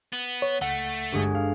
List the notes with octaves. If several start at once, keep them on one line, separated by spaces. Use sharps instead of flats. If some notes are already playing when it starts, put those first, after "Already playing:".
B3
C#5
C#2 A3 F#5
G1 G2 G#3
F5